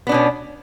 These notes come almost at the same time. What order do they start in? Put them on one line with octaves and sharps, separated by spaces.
B3 D4 B2 C#4